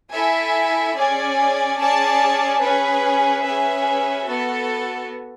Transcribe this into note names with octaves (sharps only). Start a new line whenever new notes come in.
E4 A4 E5 G#5
C#4 G#4 D5 G#5
C#4 G#4 D5 A5
C#4 G#4 B4
C#4 G#4 B4 E5
B3 F#4 A4